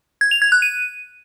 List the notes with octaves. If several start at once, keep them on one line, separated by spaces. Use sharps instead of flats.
G#6
F7
G#6
F#6
D#7